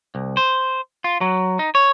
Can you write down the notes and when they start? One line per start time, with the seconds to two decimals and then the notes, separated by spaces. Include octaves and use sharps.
0.15 C2
0.37 C5
1.04 F4
1.21 F#3
1.59 D#4
1.75 C#5